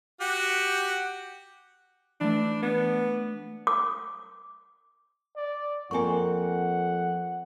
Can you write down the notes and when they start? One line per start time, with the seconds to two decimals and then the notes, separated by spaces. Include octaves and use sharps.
0.21 F#4 G4
2.21 E3 A3 D4
2.63 B3 D4
3.67 D6
5.36 D5
5.91 F2 A#3 C4 A#4 F#5 G#5 C#6